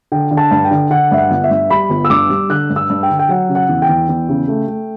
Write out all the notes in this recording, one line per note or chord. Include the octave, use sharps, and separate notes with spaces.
D3 G5
D3
A5
G2
G5
D3
D3 F#5
G2 E5
F#5
G1
E5
G2
G3 B5
G1
E6
G2 D6
G3
D3 F#6
G2
E6
G2
G5
D3
G5
F#3 F#5
C#3
F#5
E2
G5
E2
E2
C#3
A3
A3